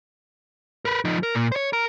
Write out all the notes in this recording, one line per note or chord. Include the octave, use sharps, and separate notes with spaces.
A#4 B4
F3 D#4
A#4
A#2
C5 C#5
A#4